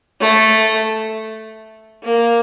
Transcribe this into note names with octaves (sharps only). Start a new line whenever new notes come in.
A3
A#3